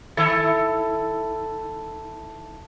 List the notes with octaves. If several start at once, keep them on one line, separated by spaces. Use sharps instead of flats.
D#3 E4 A4